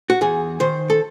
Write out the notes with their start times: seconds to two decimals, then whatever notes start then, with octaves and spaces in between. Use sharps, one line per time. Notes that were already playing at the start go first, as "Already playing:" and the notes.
0.10 F#4
0.21 E2 G#4
0.60 D#3 C5
0.90 A4